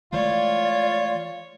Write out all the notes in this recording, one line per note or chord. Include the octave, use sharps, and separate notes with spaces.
E3 G#3 A3 F4 C#5 D5